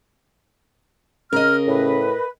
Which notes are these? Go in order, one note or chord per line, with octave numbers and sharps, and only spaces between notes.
C#3 A#4 D#5 F6
A2 B4